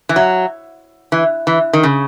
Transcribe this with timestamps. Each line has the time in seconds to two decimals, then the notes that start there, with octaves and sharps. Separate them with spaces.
0.09 E3
0.16 F#3
1.12 E3
1.47 E3
1.73 D#3
1.83 C#3